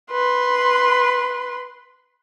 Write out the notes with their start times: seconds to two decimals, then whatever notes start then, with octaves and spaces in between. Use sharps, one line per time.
0.11 B4 C6